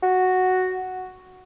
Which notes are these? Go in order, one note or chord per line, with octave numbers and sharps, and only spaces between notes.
F#4